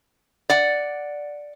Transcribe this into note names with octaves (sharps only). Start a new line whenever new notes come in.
D5 F#5